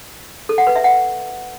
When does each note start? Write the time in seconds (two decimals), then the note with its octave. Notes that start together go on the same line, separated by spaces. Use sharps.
0.49 A4
0.58 F#5
0.67 B4
0.76 E5
0.84 F#5